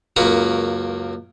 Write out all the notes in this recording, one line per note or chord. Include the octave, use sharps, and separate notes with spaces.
C#2 F#2 A#3 B4 C#5 A#5